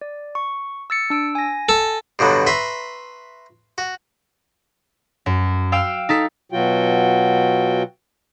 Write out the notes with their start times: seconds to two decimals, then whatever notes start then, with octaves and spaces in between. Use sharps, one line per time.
0.01 D5
0.35 C#6
0.90 E6 A6 C#7
1.10 D4 E6 D7
1.35 G#5 A#6
1.69 A4
2.19 G2 B2 D3 F#3
2.47 B4 E5 A#5 C6 C#6
3.78 F#4
5.26 F#2
5.72 F5 G5 E6 F6
6.09 D#4 A4 B6
6.52 B2 F#3 F4 F#4 G5